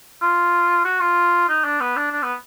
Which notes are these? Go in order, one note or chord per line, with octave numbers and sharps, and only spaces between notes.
F4
F#4
F4
D#4
D4
B3
D4
D4
B3